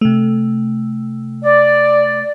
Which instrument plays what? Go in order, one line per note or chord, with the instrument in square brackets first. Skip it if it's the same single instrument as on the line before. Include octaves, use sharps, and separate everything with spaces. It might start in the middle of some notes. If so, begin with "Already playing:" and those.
[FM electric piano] C3 A3
[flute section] D5